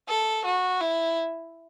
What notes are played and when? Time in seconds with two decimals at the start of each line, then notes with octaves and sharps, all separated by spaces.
0.09 A4
0.45 F#4
0.80 E4